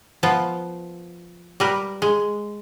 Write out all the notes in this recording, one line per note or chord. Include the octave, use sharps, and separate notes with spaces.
F3 B3 F4
G3 A#4 B4
G#3